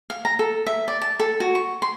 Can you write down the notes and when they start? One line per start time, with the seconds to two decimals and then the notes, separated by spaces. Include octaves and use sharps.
0.10 F5
0.25 A#5
0.39 A4
0.67 E5
0.88 D5
1.02 A5
1.20 A4
1.40 F#4
1.55 C#6
1.82 C6